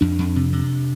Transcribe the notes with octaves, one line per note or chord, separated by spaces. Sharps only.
F2 D4
F2
C3
C3